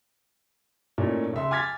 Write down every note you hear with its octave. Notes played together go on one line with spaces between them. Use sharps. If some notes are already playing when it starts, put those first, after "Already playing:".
A#2 A3 C#4 D#4 E4
C#2 E5 C6
G#5 D6 F6 G#6 A6 B6